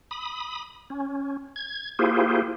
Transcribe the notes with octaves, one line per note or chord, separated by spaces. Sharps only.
B5 D#6
C#4
G#6
A#3 E4 F4 G4 G#4 C5